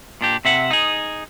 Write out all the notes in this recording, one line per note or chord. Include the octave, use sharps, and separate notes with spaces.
A#2 D4 G4
C3 E5 F#5
D#4 G#4